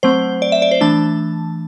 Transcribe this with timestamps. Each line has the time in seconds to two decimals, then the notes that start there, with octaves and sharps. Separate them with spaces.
0.03 F#3 A3 C4 C5
0.42 D5
0.52 E5
0.62 D5
0.71 C5
0.81 E3 A3 D4 A5